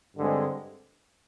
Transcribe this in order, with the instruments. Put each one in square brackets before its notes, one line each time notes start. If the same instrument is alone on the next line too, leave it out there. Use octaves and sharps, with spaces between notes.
[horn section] G2 D3 G#3 C4